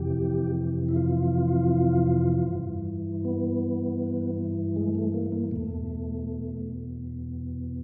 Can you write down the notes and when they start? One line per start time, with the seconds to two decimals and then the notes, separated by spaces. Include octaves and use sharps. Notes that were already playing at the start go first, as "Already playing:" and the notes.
Already playing: F2 C3 E3 G4
0.89 E4
0.96 F4
2.48 G2 E3
3.25 B3
4.76 G#3
4.95 A3
5.14 A#3
5.32 A#3
5.51 E2 B2 A3